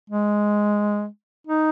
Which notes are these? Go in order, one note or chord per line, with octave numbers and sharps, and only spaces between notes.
G#3
D#4